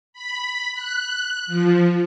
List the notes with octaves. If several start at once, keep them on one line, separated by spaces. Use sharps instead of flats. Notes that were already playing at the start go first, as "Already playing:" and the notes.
B5
F#6
F3